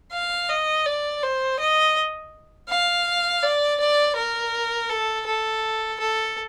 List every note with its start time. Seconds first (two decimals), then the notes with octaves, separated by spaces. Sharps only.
0.13 F5
0.49 D#5
0.86 D5
1.23 C5
1.60 D#5
2.69 F5
3.43 D5
3.80 D5
4.16 A#4
4.90 A4
5.27 A4
6.00 A4